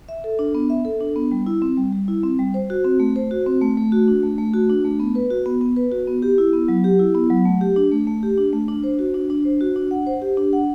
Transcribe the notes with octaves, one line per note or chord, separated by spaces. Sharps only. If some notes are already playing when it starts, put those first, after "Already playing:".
E5
A4
D4
B3
E5
A4
D4
B3
G3
E4
C4
G3
G3
E4
C4
G3
C5
F#4
C4
A3
C5
F#4
C4
A3
A3
F#4
D4
A3
A3
F#4
D4
A3
B3
B4
F#4
B3
B3
B4
F#4
B3
G4
E4
B3
F#3
G4
E4
B3
F#3
A3
G4
D4
A3
A3
G4
D4
A3
D4
C5
F#4
D4
D4
C5
F#4
D4
F#5
C5
G4
D4
F#5